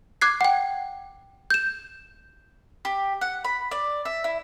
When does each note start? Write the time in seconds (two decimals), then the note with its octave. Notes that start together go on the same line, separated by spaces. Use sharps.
0.21 D6 F#6 G#6 C7
0.41 F#5 G5
1.50 G6 E7
2.85 G4
3.21 F#5
3.44 B5
3.71 D5
4.05 E5
4.24 E4